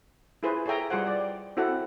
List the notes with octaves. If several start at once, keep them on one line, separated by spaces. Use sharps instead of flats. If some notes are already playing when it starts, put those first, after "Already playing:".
E4 F4 G#4 B4 C5
G#4 A4 C#5 E5 G5 A#5
G3 F4 G#4 C5 F#5
D5
G5
C4 E4 F#4 A4 F#5